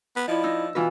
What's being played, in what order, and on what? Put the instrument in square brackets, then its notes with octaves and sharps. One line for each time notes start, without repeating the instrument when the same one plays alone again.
[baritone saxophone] B3
[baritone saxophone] F3 [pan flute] E4 [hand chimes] D5 D#5
[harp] D#4 [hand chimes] E6
[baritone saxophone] B2 [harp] E3 F4 B4